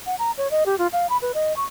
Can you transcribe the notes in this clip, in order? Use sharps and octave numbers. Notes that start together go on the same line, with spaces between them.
F#5
A#5
C#5
D#5
G4
F4
F5
B5
B4
D#5
C#6